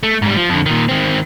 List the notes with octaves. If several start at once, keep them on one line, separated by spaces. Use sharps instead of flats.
A3
G#2 G3
F3
F2 D3
A#2 D#3
D#3 C4